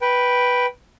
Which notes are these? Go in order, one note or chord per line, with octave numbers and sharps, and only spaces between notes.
B4 G5